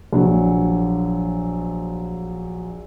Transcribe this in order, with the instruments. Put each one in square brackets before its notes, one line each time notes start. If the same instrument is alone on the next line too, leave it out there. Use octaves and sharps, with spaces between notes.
[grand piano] A#1 F#3